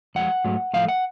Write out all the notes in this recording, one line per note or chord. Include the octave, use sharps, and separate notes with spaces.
F2 F3 G#3 F#5
G#2 F#3 A3
A2 F3 A3 F5
F#5